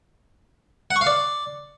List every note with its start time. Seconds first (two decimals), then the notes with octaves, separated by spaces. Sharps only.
0.91 F#5
0.96 C#6
1.01 F5
1.07 D5